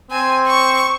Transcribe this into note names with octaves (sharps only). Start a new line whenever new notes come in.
C4 G#5
C#6